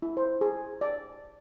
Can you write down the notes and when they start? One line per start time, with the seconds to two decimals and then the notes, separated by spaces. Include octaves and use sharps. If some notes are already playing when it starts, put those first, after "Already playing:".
0.02 E4
0.17 C5
0.41 G#4
0.81 D5